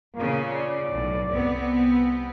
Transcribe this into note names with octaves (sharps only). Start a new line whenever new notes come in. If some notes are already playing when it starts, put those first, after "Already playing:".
A#2 C#3 A#3
D5
B1 A2
C2 B3 C4